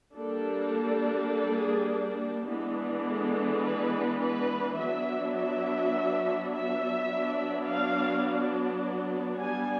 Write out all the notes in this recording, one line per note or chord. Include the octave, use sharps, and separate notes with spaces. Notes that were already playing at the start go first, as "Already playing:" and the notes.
G3 A#3 D4 A4
A4
G#4
E3 G#3 B3 D4
A4
B4
B4
F#3 B3 D4 E5
E5
E5
F#3 B3 D4
F5
G3 B3 D4 G#5